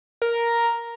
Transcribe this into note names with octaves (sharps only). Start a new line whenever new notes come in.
A#4